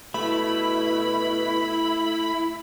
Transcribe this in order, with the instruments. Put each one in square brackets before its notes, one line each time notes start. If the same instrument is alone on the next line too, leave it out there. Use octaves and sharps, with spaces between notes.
[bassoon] B2 [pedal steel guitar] A3 [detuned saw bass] E4 [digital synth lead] B5